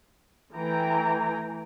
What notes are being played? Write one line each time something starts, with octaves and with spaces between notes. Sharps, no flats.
E3 A3 G5 G#5 A#5